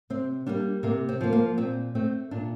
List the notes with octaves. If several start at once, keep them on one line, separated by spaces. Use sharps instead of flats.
C3 C4
G3 A#3 D4
C3 A#3
C4
F3 A#3
A#3
A#2 C4
A3 C4
A#2 D4